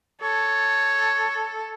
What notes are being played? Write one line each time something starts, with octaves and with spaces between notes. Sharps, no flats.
A4 C#5